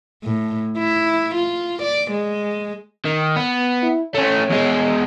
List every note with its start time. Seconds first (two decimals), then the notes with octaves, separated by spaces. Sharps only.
0.24 A2
0.78 E4
1.35 F4
1.83 D5
2.11 G#3
3.06 D#3
3.36 B3
3.83 E4
4.14 A3 C#4 C#5
4.50 E2 G#3